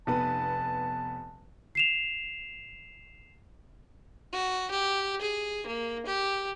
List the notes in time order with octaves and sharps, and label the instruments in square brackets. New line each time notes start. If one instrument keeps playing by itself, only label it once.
[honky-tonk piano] F1 B3 B4 [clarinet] A5
[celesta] C7 E7 F7
[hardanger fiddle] F#4
G4
G#4
A#3
G4